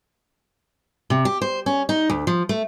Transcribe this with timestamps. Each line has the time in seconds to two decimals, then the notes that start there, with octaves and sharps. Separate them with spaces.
1.10 C3
1.25 G4
1.42 C5
1.66 C#4
1.89 D#4
2.10 D2
2.27 F3
2.49 A3